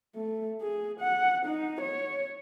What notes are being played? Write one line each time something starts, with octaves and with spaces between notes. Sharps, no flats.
A3
G#4
F#5
D#4
C#5